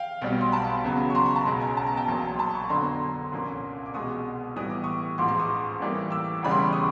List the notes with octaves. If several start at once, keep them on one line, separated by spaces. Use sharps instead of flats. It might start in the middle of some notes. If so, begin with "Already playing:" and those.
Already playing: F5 G5
B1 B2 G3
C6
A5 B5
C#2 C#3 F#3 B3
C#6
A#5 C6
B5 C#6
A5 B5
B1 B2 G#3 C#4
G#5 A#5
A5
A#5
G5 A5
A#1 A#2 F#3
C6
A5 B5
B5 C#6
F2 D3 F#3 B3 A#5 C6
C2 A#2 F3 A#3 C#4
D6
C2 B2 G#3 C#6 D#6
A2 E3 G3 B3 D#6
D6
C#6 D#6
A1 G#2 F3 G#3 C6 D6
C6 D6
C#6 D#6
A2 E3 G3 A#3
D6 E6
E1 E2 C#3 E3 G3 B5
C6
C#6
D6
C#6 D#6